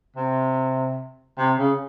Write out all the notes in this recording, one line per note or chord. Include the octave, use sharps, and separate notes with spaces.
C3
C3
C#3